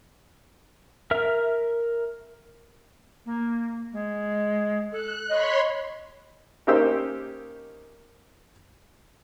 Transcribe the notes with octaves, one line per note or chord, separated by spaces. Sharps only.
A#4 E5 F6
A#3
G#3
A4 F#6
C#5 D#5 B5 C6
A#3 C#4 D#4 G4 C5 E6